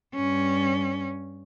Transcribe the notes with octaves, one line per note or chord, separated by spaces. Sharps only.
G2 C#4